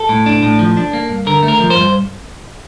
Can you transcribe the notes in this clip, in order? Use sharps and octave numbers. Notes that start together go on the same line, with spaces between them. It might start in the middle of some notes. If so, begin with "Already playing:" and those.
Already playing: A4
A2
D4
A2
F3
D4
A#3
G2
D3 A#4
A3
A#4
F3
C5
G2